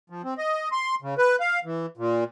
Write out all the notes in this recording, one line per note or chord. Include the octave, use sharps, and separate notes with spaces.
F3
C4
D#5
C6
C#3
B4
F5
E3
A#2